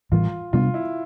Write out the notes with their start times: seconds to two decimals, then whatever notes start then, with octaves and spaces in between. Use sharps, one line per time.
0.12 A2 E3 G3 F4
0.53 C3 G3 B3 D4 F4
0.74 E4